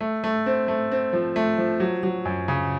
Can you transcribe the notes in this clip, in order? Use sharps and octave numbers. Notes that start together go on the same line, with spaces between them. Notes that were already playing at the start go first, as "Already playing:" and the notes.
A3
A3
C4
A3
C4
F3
A3
F3
F#3
F#3
F#2
C#3